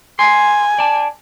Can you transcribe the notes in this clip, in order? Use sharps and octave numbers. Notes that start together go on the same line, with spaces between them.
G#5 C6
D5 A5